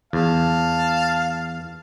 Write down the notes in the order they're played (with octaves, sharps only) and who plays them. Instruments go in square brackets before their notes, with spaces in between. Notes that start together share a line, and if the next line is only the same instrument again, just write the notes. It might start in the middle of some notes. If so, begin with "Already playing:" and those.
[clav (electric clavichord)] E2 [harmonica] F5 A5